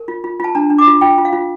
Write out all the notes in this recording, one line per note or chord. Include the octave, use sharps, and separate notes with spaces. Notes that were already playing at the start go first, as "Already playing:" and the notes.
Already playing: A#4
F4
F4
F4 A5
D4 A#5
D4
D6
F4
F4 G5
F4
F5
F4